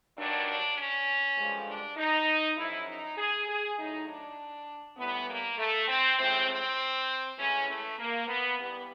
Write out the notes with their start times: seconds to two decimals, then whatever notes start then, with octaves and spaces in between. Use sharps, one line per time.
0.17 G2 D#3 F#3 D4
0.46 D4
0.76 C#4
1.37 G2 D3 F3 G#3
1.67 D4
1.97 D#4
2.57 F#2 C#3 F3 E4
2.87 D#4
3.18 G#4
3.47 G#4
3.78 A2 F#3 D#4
4.07 D4
4.97 A2 E3 G3 B3
5.27 A#3
5.58 A3
5.88 C4
6.18 A2 F3 G#3 C4
6.49 C4
7.38 A2 E3 G#3 C#4
7.68 A3
7.98 A#3
8.28 B3
8.58 G2 E3 G3 B3